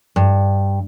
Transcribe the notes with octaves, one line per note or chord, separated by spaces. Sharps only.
G2